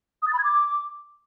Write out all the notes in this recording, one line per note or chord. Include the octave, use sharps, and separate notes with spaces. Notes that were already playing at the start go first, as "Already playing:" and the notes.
D#6
A6
B5
G#6
D6